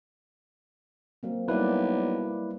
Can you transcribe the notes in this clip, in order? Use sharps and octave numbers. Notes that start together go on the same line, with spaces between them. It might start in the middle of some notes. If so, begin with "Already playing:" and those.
F#3 A#3 C4
B1 G3 A#3 E4 B4 D5